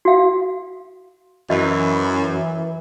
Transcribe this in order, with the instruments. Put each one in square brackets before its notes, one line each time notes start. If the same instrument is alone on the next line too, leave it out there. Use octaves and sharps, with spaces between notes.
[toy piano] F#4 F5
[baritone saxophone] F#2 [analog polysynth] E3 [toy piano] D#5